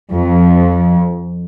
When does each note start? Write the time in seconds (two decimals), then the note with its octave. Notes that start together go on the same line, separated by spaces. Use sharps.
0.13 F2